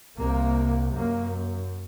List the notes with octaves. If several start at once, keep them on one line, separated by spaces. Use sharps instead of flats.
C2 C3 A#3
F#2 A#3